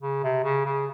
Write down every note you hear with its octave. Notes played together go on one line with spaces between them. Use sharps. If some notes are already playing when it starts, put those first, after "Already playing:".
C#3
C3
C#3
C#3